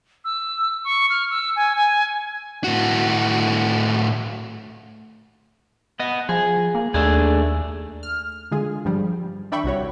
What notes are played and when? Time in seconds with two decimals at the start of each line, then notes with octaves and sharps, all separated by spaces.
0.24 E6
0.84 C#6
1.10 F6
1.30 E6
1.56 G#5
1.76 G#5
2.64 A2 F#4
6.00 B3 D#5
6.29 F3 G#4
6.75 A#3
6.94 D#2 A3 D4 G#4
8.03 F6
8.51 D3 G#3 F4 G#4
8.85 G2 F3 G3
9.52 D#3 D4 E5 G5 B5 C#6
9.64 C2 C3 F#4 C#5